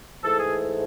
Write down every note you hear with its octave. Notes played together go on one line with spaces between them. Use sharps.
G#2 E3 A3 A4
G#4